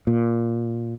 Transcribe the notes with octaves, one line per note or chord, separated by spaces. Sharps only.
A#2